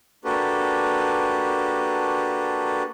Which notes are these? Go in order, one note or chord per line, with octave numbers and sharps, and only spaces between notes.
A#3 D4 F#4 G4 A4 B4